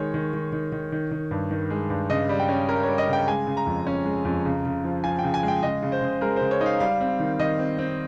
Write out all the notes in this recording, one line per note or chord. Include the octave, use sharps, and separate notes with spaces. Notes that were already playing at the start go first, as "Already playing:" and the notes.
Already playing: D#3 G#3 C#5
D#3
D#3
D#3
D#3
D#3
D#3
G2
D#3
G#3
G2
C#3 D#5
G3
G5
C#4
C#4 A#4
G3 C#5
D#5
C#3
G5
G#3 G#5
C#3
A#5
F2
C#4
G#3
F2
C#3
C#3
F3
F3 G#5
C#3 G5
G#5
G#3
G5
C#3 D#5
C#3
C5
C#3
G#3 A#4
C#3 C5
C#5
D#4
F5
G3 F5
C4
D#3
D#3 D#5
C4
C4